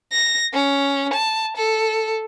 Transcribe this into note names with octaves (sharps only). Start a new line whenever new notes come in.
A#6
C#4
A5
A4